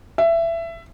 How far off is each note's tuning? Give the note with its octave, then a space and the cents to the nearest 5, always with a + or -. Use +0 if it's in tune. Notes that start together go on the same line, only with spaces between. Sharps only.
E5 +20